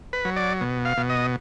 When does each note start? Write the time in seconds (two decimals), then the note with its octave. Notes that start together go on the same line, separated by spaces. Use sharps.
0.13 B4
0.25 F#3
0.36 D5
0.61 B2
0.85 F5
0.97 B2
1.10 D#5